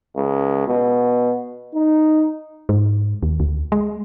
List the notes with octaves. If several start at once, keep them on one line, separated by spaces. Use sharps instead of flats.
C#2
B2
D#4
G#2
D#2
D2
G#3